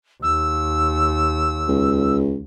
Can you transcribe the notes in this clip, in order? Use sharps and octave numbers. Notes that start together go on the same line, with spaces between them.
D#2 E6
C#2